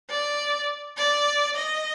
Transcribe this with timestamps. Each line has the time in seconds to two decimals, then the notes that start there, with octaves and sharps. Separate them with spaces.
0.10 D5
0.97 D5
1.56 D#5